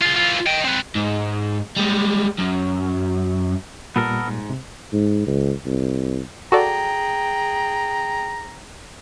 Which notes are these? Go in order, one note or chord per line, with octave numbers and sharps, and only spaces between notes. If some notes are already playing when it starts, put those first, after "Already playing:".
F4 G#4
E3 F4
D#5 G5
C4 B4
G#2
G3 G#3
F#2
A#2 G3 B3 A4 A#4
G#2
C3
G#2
C#2
C2
F#4 G#4 A4 D5 G5 A#5